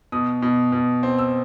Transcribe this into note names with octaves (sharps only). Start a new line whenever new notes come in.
B2 D#6
B2
B2
C4
E6